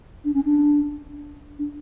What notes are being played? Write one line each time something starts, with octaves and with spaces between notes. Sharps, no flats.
D4
C#4
D4
D4